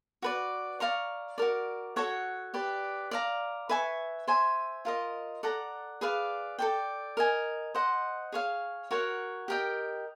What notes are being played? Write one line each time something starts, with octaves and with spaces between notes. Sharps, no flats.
F#4 B4 D5
D5 F5 A#5 C#6
F#4 A#4 D5
F#4 A4 C#5 F#5
G4 B4 D5
D5 F5 A#5
B4 E5 G#5 C#6
C5 E5 G#5
F4 A#4 D#5
A4 D5 F#5 A#5
G#4 B4 D5 F5
A4 D5 G5
A#4 D#5 G#5
C5 D#5 F#5
G#4 C#5 F5
F#4 A#4 C#5 F#5
G4 A#4 D#5 G5